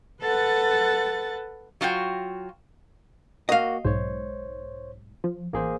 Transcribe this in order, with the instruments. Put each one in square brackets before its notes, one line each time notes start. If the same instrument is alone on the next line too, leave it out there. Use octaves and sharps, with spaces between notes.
[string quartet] A4 B4 F#5 A6
[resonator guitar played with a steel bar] F#3 F4 F#4 G5
[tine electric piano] A#3 F#4 [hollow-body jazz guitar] D#5 F5
[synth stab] B1 G#2 [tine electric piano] C5 C#5
[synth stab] F3
[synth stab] A1 [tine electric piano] A#3 G#4 C5